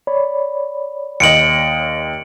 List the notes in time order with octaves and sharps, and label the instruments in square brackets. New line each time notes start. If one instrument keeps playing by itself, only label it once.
[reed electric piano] C#5 D5 B5
[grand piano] D#2 D#5 [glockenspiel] C#7 D7 F#7